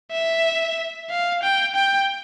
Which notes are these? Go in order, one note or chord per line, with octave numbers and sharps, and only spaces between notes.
E5
F5
G5
G5